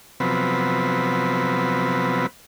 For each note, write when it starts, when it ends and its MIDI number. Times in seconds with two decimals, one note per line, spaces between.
0.20 2.27 48
0.20 2.27 53
0.20 2.27 54
0.20 2.27 59
0.20 2.27 60
0.20 2.27 71